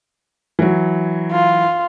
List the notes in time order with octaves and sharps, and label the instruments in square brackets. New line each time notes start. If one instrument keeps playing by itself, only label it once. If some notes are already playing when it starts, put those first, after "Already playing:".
[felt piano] E3 F#3
[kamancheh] F4